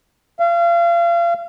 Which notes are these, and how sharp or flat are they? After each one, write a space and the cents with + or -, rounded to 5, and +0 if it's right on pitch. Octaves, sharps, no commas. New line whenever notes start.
F5 -35